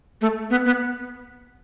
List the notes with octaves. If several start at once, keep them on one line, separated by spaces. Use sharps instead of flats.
A3
B3
B3